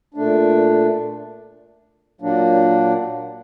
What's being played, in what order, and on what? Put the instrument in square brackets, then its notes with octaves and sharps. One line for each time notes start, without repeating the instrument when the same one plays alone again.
[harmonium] A#2 A3 D4
A#2 F#3 A#3 D4